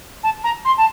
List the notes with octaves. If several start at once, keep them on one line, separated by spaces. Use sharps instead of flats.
A5
A#5
C6
A5